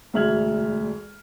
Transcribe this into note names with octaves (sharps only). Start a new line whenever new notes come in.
E1 D2 E5 F6 G#6 F#7